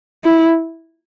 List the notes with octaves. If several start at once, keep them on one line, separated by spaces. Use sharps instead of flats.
E4